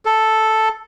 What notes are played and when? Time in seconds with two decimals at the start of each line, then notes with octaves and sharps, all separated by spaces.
0.05 A4